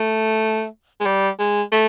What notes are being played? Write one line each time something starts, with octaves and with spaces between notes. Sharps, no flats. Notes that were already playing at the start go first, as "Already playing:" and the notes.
Already playing: A3
G#3
G3
G#3
A3